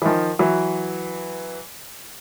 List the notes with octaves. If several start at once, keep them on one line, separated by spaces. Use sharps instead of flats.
E3
D#3 F3
E3 F#3